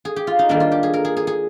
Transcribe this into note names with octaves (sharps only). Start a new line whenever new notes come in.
G#4
G4
F4
D#4
D#3 G3 A#3 D4
F4
G4
G#4
A#4
G#4
G#4
G#4